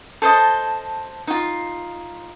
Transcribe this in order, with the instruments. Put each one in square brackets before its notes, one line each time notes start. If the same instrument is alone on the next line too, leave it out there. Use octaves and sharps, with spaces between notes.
[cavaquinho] A4 C5 D#5 A5
D#4 F4